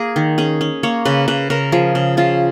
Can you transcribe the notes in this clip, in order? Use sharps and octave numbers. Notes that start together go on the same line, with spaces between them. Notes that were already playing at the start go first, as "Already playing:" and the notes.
Already playing: A#3 G#4 A#4
D#3
C#4 G#4
C#4
A#3 C#5
C#3 B4
C#3 B4
C#3 A#4
F3 G#4
C#3
C#3 F4